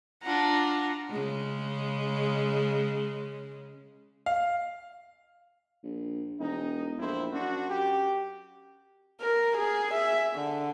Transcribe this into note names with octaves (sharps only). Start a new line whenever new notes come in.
D4 F4 F#5 A#5
C#3 G#3
F5
A#1
E1 D#4
A#1 F2 E4 C5
F#2 D4 F#4
G4
A#4
G#4
E5
D3